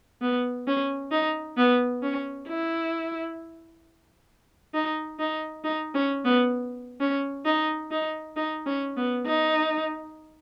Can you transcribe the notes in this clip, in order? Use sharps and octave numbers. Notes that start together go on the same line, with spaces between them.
B3
C#4
D#4
B3
C#4
E4
D#4
D#4
D#4
C#4
B3
C#4
D#4
D#4
D#4
C#4
B3
D#4